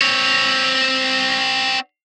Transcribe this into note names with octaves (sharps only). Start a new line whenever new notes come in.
C4 C#5